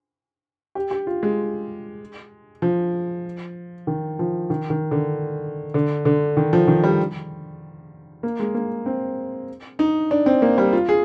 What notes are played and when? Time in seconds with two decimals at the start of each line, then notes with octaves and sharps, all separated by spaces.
0.75 G4
0.91 G4
1.07 F4
1.23 G#3
2.62 F3
3.87 D#3
4.19 F3
4.50 D#3
4.70 D#3
4.91 D3
5.74 D3
6.05 D3
6.37 D#3
6.53 F3
6.68 D#3
6.84 G3
8.23 A#3
8.40 G#3
8.54 A#3
8.86 C4
9.79 D#4
10.11 D4
10.26 C4
10.42 A#3
10.58 G3
10.73 F4
10.89 G#4